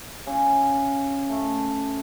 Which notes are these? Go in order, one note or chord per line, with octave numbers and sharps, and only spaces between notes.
C#3
A3